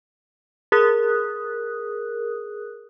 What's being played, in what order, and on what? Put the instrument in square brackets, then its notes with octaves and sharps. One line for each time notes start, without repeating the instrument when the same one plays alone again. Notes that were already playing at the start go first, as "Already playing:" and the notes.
[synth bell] G#4 A#4 D#6 F#6